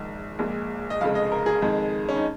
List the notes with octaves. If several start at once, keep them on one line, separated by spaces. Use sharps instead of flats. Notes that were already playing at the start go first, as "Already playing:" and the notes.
Already playing: A#1 G#2 D#3
A#1 A#2 G#3
D#5
F1 F2 C#3 G#3 F5
D#5
A#4
G#4
F2 D#3 G#3
C#4
D#4